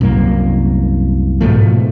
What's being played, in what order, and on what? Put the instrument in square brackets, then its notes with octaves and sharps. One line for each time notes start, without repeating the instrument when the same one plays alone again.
[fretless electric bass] C2 F#2 A#3
G#2 B2 F3 A3